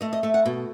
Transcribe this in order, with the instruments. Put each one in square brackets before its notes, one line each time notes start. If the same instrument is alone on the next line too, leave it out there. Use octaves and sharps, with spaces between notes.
[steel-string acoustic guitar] A3 D#5
D#5
A3 E5
F#5
B2